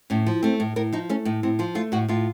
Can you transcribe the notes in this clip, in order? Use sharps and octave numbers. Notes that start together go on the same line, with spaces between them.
A2 C#4
F3
A3 C4
A2
A2 A#4
F3 D#4
A3 C#4
A2 D#4
A2 C4
F3 F4
A3 F4
A2 F#4
A2 F4